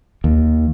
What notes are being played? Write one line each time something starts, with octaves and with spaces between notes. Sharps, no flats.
D#2